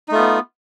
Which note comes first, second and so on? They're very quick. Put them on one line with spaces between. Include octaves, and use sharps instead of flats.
D#4 A3 F4 B3